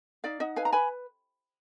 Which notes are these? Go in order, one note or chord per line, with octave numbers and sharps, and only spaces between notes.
D#4 D5 F5
D#4 D#5 F#5
B4 F5 G#5
A#5
B4 G#5 B5